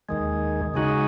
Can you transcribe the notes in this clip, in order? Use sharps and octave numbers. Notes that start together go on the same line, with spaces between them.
D#2 D#3 G#3
C#3 G#3 D#4 F#4